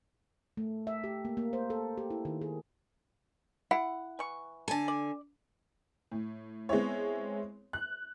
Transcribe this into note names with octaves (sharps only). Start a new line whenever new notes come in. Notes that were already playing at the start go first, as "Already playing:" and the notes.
A3
E5
G4
A#3
A#3
C5
A4
G4
E4
D#3
G#4
E4 F#5
E3 C#6
D3 A4 G#5 A5
D5
A2
G#3 B3 C4 E4 C#5
F#6